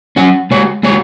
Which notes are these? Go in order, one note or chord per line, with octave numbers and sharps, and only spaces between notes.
F#3 C#4 F#4
G#3 F#4 C#5
G#3 F#4 C#5